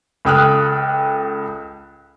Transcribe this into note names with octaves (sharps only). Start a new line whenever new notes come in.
C#2 A4 G5 D#6 F6 F#6